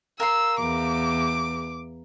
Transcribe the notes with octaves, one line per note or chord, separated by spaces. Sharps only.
A#4 F5 C6 E6
E2 D6